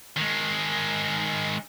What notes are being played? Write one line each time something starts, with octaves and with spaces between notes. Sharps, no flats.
D#3 G#3